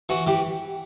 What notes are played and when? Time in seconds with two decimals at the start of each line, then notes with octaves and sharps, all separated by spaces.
0.09 E3 F#4
0.27 E3 G4